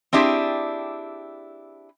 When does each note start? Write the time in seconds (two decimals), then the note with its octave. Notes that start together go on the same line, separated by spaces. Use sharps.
0.13 C4 D4 E4 G4 G#4